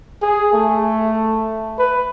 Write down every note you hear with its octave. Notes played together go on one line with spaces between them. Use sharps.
G#4
A3
B4